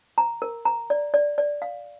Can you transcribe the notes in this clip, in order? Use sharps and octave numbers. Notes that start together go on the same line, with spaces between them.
A#5
A#4
A#5
D5
D5
D5
F5